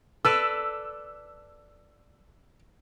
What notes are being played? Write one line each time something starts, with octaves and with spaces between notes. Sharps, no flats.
A4 B4 D5 E6